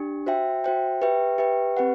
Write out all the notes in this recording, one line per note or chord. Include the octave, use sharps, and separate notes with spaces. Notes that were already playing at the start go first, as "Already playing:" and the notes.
Already playing: D4 G4
F#4 C5 E5 G5
F#4 C5 E5 G5
G4 B4 E5 G5
G4 B4 E5 G5
C4 G4 B4 F#5